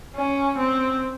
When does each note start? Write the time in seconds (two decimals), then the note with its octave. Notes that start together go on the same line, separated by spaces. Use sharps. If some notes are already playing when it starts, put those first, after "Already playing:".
0.16 C#4
0.58 C4